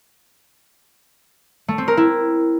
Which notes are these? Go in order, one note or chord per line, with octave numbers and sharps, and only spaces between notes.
A3
C4
A#4
E4